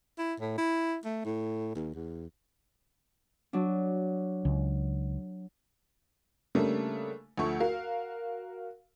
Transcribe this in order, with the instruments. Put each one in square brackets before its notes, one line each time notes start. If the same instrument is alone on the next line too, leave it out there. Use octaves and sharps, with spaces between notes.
[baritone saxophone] E4
A2
E4
A3
A2
D#2
E2
[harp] F#3 D4
[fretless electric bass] C#2
[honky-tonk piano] C#3 G3 A3 A#3 D4
D2 F3 A3 C#6
F#4 A#4 F5